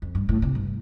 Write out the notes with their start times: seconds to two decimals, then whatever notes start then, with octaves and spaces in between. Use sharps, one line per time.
0.02 F2
0.15 G2
0.29 A2
0.42 C3
0.55 G2